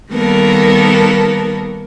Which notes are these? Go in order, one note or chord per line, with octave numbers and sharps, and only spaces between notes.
D#3 G3 A#3 B3 A4 A#4